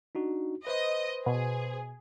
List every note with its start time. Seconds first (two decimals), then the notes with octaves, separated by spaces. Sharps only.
0.15 D4 D#4 F#4
0.67 B4 C5 D#5 C6
1.26 B2 G#4